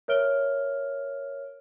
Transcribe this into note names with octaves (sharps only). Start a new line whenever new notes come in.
A#4 C#5 E5 F6 D7 G7